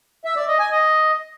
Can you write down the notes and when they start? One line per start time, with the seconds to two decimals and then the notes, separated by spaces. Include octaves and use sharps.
0.25 E5
0.36 D5
0.48 D#5
0.59 G#5
0.71 D#5